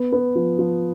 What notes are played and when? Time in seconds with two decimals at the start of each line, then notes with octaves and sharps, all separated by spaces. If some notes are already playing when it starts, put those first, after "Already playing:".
Already playing: B3
0.12 B3
0.35 F3
0.59 F3